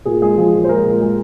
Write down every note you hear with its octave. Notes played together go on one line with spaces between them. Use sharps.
A#2 G#4
G#3 G#4
F3
A#2
C5
G#3 A#4
A#2
G#3